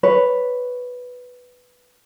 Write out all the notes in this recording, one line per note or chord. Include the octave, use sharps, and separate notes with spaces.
B4 C#5